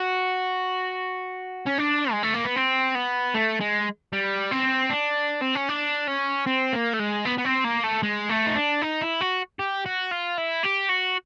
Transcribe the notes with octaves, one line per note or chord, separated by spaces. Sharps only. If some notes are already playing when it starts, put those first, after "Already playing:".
Already playing: F#4
C#4
D4
G#3
A3
A#3
B3
C4
B3
A3
G#3
G3
C4
D4
C4
C#4
D4
C#4
C4
A#3
A3
G#3
B3
B3
C4
A#3
A3
G#3
A3
D#4
D4
D#4
E4
F#4
G4
F#4
F4
E4
G4
F#4